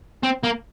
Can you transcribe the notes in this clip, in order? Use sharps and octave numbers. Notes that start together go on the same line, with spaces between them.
C4
A#3